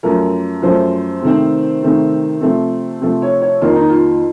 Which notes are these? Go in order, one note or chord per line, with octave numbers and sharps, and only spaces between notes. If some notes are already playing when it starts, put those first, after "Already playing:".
F#2 F3 A3 A#4
F#2 F3 A3 C5
C3 D#3 A3 C4
C3 D#3 A3 C4
C3 F3 A3 C4
C3 F3 A3 C4
C#5
C#5
F2 D#3 A#3 F4
D#4
F4